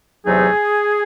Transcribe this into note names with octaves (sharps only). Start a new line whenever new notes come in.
E2 C3 F#3 A3 D#4 G#4